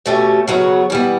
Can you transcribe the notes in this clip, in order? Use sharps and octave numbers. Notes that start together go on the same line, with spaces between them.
B2 A3 C#4 G4
C#3 F#3 B3 F#4
E3 G3 B3